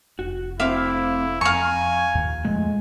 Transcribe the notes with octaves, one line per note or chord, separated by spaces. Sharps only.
F1 F#4
A3 C4 E4 C5 E5 F5 D6
F2 F5 G#5 A#5 C#6
D#2 A#2
F2 F3 G#3 A3